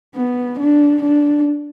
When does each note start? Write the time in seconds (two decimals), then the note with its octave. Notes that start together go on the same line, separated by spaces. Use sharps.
0.15 B3
0.60 D4
1.03 D4